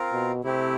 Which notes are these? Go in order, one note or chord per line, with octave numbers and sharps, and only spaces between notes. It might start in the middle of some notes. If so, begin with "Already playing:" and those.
Already playing: C4 F4 A#4
B2
C3 A3 C4 E4 G4